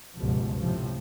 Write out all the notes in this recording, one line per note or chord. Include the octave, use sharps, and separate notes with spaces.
G1 C#2 B2 F3
A2 C3 F3